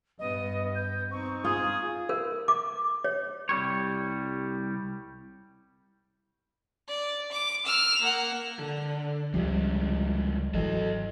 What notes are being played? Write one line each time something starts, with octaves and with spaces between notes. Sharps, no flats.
G2 B3 D#5
G6
C4 D#4 C#6
F4 G#4 D#6
A#4
D6
C#5
C2 G3 C#5
D5
D6
E6 F6
A#3 F#5
D3
C#2 C3 F3 G3 G#3
G#1 E3 F#3 A4 D#5